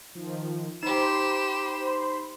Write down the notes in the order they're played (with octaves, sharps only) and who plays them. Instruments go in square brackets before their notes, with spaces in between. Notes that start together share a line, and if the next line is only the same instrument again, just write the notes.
[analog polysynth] D#3 F3
[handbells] D#4 [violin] G4 E7 [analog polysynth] C5 B5 C6